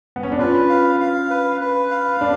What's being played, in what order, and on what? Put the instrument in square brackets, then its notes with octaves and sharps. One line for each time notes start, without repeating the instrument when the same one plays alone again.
[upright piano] B3
C#4
D4
[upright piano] C#4 F4 [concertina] B4
[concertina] F5
F5
B4
B4
F5
[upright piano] D4